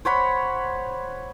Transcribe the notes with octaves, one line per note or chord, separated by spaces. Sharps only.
C5 C#5 F#5 B5